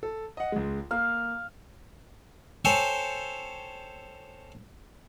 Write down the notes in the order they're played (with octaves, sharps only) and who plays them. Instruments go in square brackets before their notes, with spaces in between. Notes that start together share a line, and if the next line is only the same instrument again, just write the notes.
[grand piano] A4
D#5 F#5
C#2 G#3
[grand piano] A#3 [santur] F5
[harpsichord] A4 C5 C#5 G5 G#5